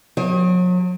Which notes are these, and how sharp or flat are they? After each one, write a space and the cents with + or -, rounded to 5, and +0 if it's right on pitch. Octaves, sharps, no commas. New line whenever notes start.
F#3 -40